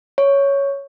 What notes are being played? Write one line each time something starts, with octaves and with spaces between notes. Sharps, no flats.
C#5